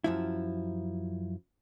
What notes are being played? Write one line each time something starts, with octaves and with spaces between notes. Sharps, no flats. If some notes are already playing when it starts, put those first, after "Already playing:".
F#2 F3 E4